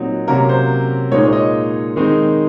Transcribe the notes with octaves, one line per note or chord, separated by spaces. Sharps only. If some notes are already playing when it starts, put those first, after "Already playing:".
Already playing: A#2 F#3 C4 D#4
C3 F#3 A#3 C#4 A#4
C5
A#2 G#3 D#4 C#5
C#5
D#5
D#3 G#3 C4 D#4